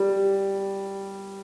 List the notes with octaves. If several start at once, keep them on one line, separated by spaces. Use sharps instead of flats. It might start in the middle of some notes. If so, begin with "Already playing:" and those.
Already playing: G3